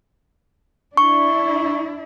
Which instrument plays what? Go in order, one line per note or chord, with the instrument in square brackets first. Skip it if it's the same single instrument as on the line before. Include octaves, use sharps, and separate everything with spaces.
[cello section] D4 E4 [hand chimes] C#6